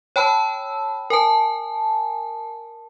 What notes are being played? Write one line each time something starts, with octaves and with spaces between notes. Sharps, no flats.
C#5 G5 A5 B5 E6
A#4 G#5 A5